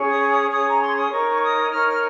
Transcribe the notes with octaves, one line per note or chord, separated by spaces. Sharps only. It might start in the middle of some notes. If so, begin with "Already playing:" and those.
Already playing: C#4 G#4 C#5
D#6
D#6
C#4 G#4 C#5 D#6
A#5
C6
D#6
D#4 A#4 C#5 C#6
C#6
D#6
D#4 A#4 C#5 F6
F6